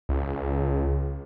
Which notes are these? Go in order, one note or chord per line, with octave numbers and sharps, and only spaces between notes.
C#2